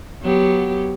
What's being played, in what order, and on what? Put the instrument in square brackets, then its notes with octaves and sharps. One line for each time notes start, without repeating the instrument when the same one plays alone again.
[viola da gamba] F#3 B3 G4